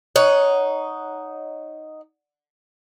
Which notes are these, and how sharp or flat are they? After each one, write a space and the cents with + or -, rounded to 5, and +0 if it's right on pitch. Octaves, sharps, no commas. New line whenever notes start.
D#4 +0 C#5 +15 F#5 -5